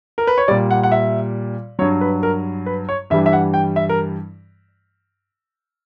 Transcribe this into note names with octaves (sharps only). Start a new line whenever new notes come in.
A#4
B4
C#5
A#2 G3 D5
F#5
F#5
E5
G2 F#3 C#5
B4
A#4
B4
C#5
G2 E3 G3 E5
E5
F#5
G5
E5
A#4